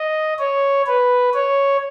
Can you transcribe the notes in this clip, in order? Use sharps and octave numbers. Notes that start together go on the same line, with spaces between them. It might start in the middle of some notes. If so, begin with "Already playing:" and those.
Already playing: D#5
C#5
B4
C#5